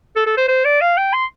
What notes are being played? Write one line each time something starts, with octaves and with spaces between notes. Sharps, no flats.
A4
A4
C5
C5
D5
F5
G5
C6